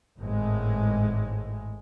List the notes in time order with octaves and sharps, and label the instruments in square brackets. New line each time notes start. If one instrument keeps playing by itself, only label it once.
[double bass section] G#1 A2 G#3